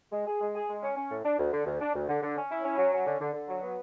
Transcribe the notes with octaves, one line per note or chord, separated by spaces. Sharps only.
G#3
G#4
G#3
G#4
G#3
C#4
C#4
A2
D4
D2
D3
D2
D4
D2
D3
D3
C#4
E4
C#4
F#3
C#4
D3
D3
D3
F#3
B3